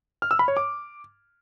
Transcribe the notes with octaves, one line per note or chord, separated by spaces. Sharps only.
F6
E6
B5
C#5
D6